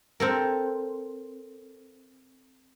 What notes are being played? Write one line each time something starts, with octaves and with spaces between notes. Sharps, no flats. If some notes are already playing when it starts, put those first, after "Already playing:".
C4 A4 A#4